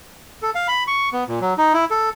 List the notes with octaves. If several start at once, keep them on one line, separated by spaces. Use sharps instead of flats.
A4
F5
B5
C#6
B3
A#2
F#3
D#4
E4
A4